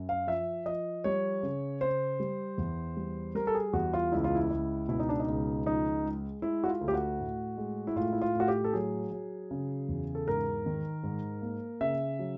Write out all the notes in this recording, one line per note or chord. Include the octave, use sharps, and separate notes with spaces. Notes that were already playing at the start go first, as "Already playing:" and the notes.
Already playing: F#2
F5
F3 E5
F3 D#5
G3 C#5
C#3
C#3 C5
G3
E2
G3
G3 A#4
A4
G#4
E2 F#4
F4
C#2 E4
F4
E4
C#2
B2 E4
D#4
D4
D#4
C#2
F3 D#4
G#3
G#3 E4
F#4
F4
D2
G4
F#4
A2
G#3
E4
A2 F4
E4
F4
A2 F#4
G4
A4
F#3 G#4
F#3
C#3
E2
A4
G#2 A#4
D#3
G#2
A#3
C#3 E5
F#3